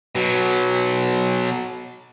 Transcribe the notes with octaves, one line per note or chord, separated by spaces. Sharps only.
B2 F#3